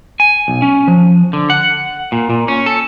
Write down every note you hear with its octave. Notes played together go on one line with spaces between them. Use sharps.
G#5
B1
C#4
F3
D3
F#5
A#2
A#2
C#4
A4